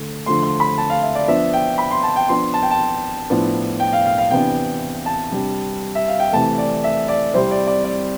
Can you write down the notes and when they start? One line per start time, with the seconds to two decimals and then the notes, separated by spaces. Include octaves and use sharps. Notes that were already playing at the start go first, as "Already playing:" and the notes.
Already playing: D3 A3
0.26 D3 F3 A3 C6
0.43 C6
0.60 B5
0.78 A5
0.90 F5
1.03 E5
1.15 D5
1.28 F3 B3 D4 E5
1.53 G5
1.78 B5
1.91 C6
2.03 A5
2.16 G5
2.28 F3 B3 D4 C6
2.54 A5
2.63 G5
2.71 A5
3.30 A2 F3 B3 D4
3.80 G5
3.93 F5
4.06 F5
4.18 F5
4.31 C3 E3 B3 D4 G5
5.06 A5
5.32 C3 G3 D4
5.95 E5
6.08 F5
6.20 G5
6.33 C3 E3 A3 A5
6.58 D5
6.84 E5
7.08 D5
7.33 C3 G3 C4 E4 C5
7.51 D5
7.67 D5
7.84 D5